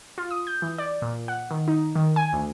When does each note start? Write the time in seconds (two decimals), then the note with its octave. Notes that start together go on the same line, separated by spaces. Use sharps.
0.18 F4
0.31 D#6
0.47 G6
0.62 E3
0.78 D5
1.02 A#2
1.28 F#5
1.51 D#3
1.68 D#4
1.96 D#3
2.16 G#5
2.33 D2